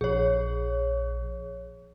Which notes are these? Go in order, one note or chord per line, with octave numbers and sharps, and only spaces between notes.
A#1 G#4 C#5